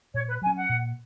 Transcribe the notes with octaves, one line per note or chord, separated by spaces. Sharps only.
A#2 C#5
B4
F#3 C#4 G#5
F#5
A#2